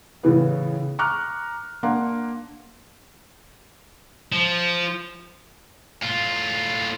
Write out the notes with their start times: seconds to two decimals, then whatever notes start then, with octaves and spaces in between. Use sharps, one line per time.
0.23 A2 C#3 E3 B3
0.99 A#5 C#6 D6 F6 F#6
1.83 A#3 D4 F#5 C6
4.32 F3
6.03 A2 F4